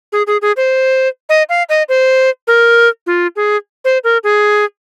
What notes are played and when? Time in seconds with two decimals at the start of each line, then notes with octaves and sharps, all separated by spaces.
0.12 G#4
0.27 G#4
0.42 G#4
0.57 C5
1.29 D#5
1.49 F5
1.69 D#5
1.89 C5
2.47 A#4
3.06 F4
3.36 G#4
3.85 C5
4.04 A#4
4.24 G#4